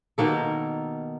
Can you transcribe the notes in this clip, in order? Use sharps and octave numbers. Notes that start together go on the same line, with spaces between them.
B2 D#3 A#3 A4